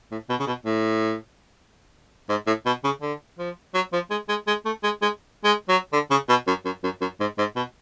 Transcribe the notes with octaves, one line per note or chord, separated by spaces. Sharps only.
A2
B2
C#3
B2
A2
G#2
A2
B2
C#3
D3
F3
F#3
F3
G#3
G#3
G#3
A3
G#3
G#3
G#3
F#3
D3
C#3
B2
F#2
F#2
F#2
F#2
G#2
G#2
B2